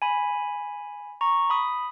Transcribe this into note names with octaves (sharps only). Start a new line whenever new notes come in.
G#5 B5
A#5 C#6
B5 D#6